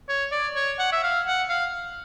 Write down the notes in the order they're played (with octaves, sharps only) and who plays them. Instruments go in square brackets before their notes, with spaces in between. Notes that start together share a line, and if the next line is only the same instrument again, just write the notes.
[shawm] C#5
D5
C#5
F#5
E5
F5
F#5
F5